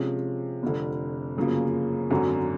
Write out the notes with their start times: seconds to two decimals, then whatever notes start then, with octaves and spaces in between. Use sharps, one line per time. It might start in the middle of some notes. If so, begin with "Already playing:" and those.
Already playing: C3 F3 G#3 C#4
0.63 F1 F2 D3
1.37 G1 F#2 C#3 F3 A#3
2.11 G#1 F#2 D3 F#3